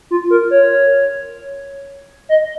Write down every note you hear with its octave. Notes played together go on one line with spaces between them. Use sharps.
F4
A#4
C#5
D#5